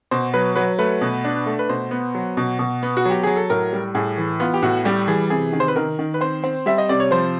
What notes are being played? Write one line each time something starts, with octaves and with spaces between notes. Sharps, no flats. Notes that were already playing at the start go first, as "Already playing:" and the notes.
B2 C5
F#3 B4
F#3 B4
A3 B4
B2
D4
A3
B4
B2 C5
B3
F#3
B2
B2
B3
F#4
F#3 G4
F#3 G#4
A4
A2 A#4
G3
A2 G#4
E3
B3 F4
G4
A2 F#4
G3 G4
E3 G#4
C3 G#4
D#3
C5
B4
D#3 A#4
D#3
B4
C4 C5
C4
G3 E5
D#5
C3 D5
C#5
F3 C5